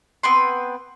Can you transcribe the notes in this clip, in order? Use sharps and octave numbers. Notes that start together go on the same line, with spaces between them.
B3 C4 B4 C6